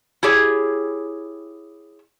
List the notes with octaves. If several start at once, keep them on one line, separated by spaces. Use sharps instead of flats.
E4 G4 G#4 C#5